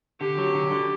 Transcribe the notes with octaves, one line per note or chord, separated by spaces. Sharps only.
D3 G4
F#3
D3
D3